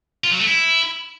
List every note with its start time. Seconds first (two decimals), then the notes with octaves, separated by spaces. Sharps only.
0.24 F4
0.32 F#3
0.40 A3
0.47 E4